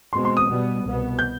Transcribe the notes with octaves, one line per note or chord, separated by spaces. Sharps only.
B2 G#3 C4 C6
C6
D#6
B2 G3 B3
C2 B2 B3
G6